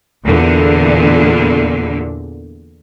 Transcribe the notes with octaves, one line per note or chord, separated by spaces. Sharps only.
E2 A#2 D3